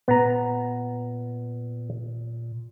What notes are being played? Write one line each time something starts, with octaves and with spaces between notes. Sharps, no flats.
A#2 B3 A#5